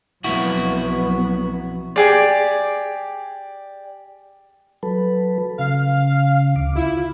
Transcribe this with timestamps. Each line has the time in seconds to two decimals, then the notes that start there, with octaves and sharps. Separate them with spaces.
0.24 B1 F2 F#3 B3 E4 F#4
1.96 G4 G#4 D5
4.83 F#3 A4 B4
5.59 C#3 F5
6.56 D2 D6
6.76 E4 F4